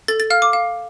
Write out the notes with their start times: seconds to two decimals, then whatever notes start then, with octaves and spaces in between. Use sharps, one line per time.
0.08 A4 A6
0.20 A6
0.30 F5 F6
0.42 D6
0.53 F5